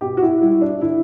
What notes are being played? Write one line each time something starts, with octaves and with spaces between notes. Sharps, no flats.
B2 G4
F#4
E4
G3 E4
D4
D3 E4